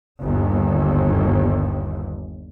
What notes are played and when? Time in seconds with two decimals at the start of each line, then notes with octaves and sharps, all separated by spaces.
0.21 G1 D#2